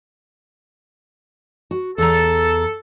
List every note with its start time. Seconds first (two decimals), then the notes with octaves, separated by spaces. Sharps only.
1.71 F#4
1.98 E2 A4 A#5